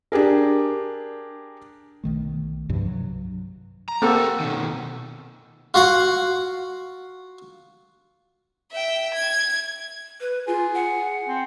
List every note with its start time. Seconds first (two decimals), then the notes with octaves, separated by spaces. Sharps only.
0.12 D4 G4 G#4 A#4
2.04 B1 D#3 A3
2.69 C2 G2 C3 F3
2.86 F#3
3.88 A#5
4.02 A#3 C4 G4 A4 F#5
4.40 B2 D#3
5.74 F4 F#4 F5 F#5
8.72 E5 G5
9.14 G#6
10.21 B4
10.47 F4 G#4
10.74 F#5
11.28 C4